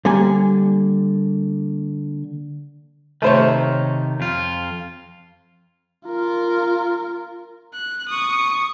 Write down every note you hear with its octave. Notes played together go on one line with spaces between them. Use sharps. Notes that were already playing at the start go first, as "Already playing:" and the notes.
D3 G3 A#3 G#5
C3 D#3 A3 C5 C#5
F2 F4
F4 A#4
F#6
C#6 D#6